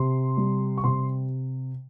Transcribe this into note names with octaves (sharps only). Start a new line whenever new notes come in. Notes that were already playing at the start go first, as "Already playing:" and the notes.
Already playing: C3 C6
G3
C#6
C3 C6